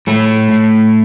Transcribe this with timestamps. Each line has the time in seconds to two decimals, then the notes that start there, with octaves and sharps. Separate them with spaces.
0.07 A2 A3
0.51 A2